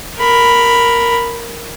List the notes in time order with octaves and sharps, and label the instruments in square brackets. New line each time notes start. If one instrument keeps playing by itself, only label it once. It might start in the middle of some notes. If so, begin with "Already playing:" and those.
[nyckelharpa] A#4 B5